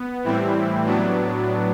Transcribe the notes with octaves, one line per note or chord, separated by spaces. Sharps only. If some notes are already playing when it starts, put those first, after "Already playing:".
Already playing: B3
A2 E3 G3 C4 E4
A2 F#3 B3 D4